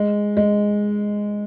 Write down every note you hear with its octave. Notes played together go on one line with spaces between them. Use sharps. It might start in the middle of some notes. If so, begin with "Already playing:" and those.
Already playing: G#3
G#3